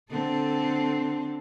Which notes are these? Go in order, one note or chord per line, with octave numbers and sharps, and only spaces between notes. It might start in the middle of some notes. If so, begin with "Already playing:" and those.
D3 C4 A4